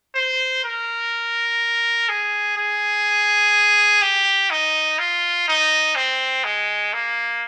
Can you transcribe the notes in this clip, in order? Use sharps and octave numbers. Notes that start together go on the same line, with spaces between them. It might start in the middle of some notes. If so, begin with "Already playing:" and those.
C5
A#4
G#4
G#4
G4
D#4
F4
D#4
C4
G#3
A#3